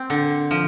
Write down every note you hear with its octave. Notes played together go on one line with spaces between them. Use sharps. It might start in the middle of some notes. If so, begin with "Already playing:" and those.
Already playing: C4
D3
F3